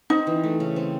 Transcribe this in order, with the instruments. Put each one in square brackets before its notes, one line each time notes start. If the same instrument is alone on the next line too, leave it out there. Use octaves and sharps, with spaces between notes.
[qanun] C4 [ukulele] D#4
[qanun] E3
A3
C#3
C4